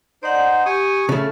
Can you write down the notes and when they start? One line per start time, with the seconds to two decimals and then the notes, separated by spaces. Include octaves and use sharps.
0.23 D#4 C5 D5 F#5
0.35 F#5
0.66 G4 G#5 C#6 D#6
1.09 C#3 A3 F4 A4